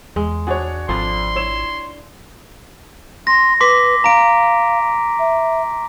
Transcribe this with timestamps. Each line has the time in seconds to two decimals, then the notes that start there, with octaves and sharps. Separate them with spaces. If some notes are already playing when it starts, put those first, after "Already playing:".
0.16 E2 G#3
0.47 D4 F#4 G#4 C#5
0.89 G#1 F2 F3 D4 C6
1.36 E4 C#5 E7
3.27 C6 A#6
3.61 B4 C6 D6 B6
4.04 F5 A#5 D7
5.19 E5